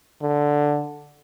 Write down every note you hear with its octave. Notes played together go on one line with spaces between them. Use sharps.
D3